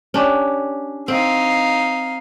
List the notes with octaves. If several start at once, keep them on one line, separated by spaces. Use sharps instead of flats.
C#4 D4 G4
C4 D#4 F5